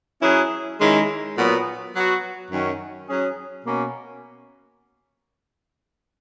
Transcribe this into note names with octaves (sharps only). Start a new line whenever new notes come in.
F#3 C#4 E4 G#4
D#3 G#3 C#4 E4
A#2 F#3 B3
F#3 B3 F#4
F#2 D#3 F#3 C#4
F#3 C#4 G#4
B2 A#3 C#4